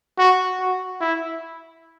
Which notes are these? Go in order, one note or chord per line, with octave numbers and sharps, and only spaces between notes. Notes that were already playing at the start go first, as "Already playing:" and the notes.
F#4
F#4
E4